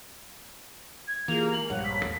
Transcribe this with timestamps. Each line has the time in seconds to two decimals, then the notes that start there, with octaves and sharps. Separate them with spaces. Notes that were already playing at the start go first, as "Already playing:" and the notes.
1.08 G#6
1.28 E3 A#3 F4 G4 G#4 F7
1.53 G#3 A#4 F#7
1.70 A#1 G2 C#5 F5 F#5
1.84 B6
2.05 E2 A3